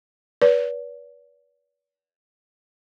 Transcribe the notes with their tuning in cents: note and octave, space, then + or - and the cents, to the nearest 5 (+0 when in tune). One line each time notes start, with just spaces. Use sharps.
B4 -25 D5 -40